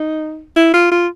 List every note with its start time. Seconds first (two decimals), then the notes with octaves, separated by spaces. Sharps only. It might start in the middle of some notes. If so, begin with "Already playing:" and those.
Already playing: D#4
0.56 E4
0.73 F4
0.91 F4